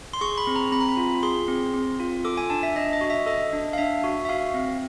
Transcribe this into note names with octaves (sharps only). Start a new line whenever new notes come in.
C6
G#4 C#6
B5
C4
A#5
C4 B5
A#5
B5
F4
G#4 C6
C4
C4
F4
A4 D6
G#5
D4 A5
E5
D4 D#5
D#5
F#4
E5
A4 D#5
D4
F5
D4 E5
F#4
E5
F#4 F5
C4